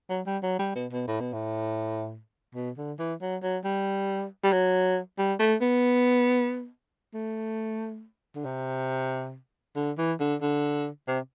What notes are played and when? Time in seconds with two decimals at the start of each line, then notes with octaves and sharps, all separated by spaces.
0.10 F#3
0.26 G3
0.43 F#3
0.59 G3
0.75 B2
0.92 B2
1.08 A2
1.21 B2
1.33 A2
2.55 B2
2.77 D3
2.99 E3
3.21 F#3
3.43 F#3
3.64 G3
4.43 G3
4.52 F#3
5.18 G3
5.39 A3
5.61 B3
7.14 A3
8.35 D3
8.45 C3
9.76 D3
9.98 E3
10.20 D3
10.42 D3
11.07 C3